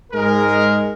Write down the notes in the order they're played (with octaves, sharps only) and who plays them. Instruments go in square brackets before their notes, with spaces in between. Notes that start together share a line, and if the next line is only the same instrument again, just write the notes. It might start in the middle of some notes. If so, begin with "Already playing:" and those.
[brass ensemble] G#2 G#3 A#4